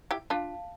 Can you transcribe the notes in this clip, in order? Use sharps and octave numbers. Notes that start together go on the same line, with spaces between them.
E4 G4
D4 F4 F5 A5